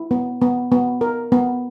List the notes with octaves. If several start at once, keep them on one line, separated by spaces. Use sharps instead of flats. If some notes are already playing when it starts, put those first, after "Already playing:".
Already playing: E4
B3
B3
B3
A#4
B3